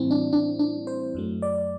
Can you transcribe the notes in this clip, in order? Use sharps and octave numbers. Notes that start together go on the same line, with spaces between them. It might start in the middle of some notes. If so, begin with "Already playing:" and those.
Already playing: A2 E3 G3 C4 E4
D4
D4
D4
C5
F#2 F#3 A3
D5